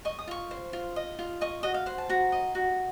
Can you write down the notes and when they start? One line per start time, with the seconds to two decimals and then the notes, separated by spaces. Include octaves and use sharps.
0.05 D#5 C#6
0.19 D#6
0.28 F4 C#6
0.51 C5
0.73 F4
0.96 D#5
1.19 F4
1.41 D#5 C#6
1.63 F#4 D#5
1.74 F5
1.86 C5 F#5
1.98 A5
2.09 F#4 A#5
2.32 D#5
2.55 F#4